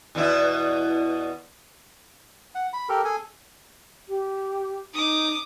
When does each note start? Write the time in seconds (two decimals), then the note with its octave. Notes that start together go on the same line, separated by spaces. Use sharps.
0.15 E2 B2 E4
2.55 F#5
2.73 B5
2.89 G4 A4 A#4
3.05 G#4 A4 G#5
4.09 G4
4.94 D#4 D6 D#6